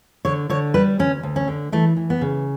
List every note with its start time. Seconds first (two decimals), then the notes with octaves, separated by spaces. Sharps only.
0.25 D3 C#5
0.50 D3 C#5
0.74 G3 B4
0.99 D2 C#4
1.23 D2
1.36 C#4
1.48 D3
1.72 E3 A3
1.97 E3
2.10 B3
2.21 C#3